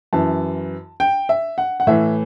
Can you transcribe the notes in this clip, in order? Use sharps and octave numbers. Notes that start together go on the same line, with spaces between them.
F#2 E3 A5
G5
E5
F#5
F#5
A2 E3 E5